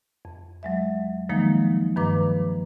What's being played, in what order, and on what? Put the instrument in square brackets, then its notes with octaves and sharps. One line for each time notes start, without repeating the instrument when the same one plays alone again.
[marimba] F2
F#3 G#3 E5
D#3 F3 F#3 G#3 A#3 D#4
G2 D#3 F3 B4 A#5 D6